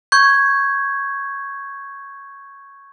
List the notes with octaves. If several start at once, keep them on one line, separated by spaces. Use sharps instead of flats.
C#6 G6 G#6